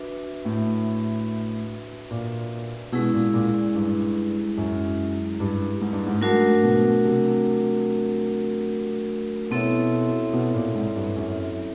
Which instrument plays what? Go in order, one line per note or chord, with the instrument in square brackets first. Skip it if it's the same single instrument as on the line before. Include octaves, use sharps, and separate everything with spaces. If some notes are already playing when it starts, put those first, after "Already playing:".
Already playing: [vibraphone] D4 F#4 B4 E5
[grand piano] A2
A#2
[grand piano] B2 [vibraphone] G#3 C#4 E4 G#4
[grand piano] A#2
A#2
G2
F#2
G2
G#2
G2
G#2
[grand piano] G#2 [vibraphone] F#3 A3 D4 F#4 A#4
[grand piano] B2
C3
[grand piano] B2 [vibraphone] C4 E4 A4 C#5 E5
[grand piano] B2
A#2
G#2
G2
F#2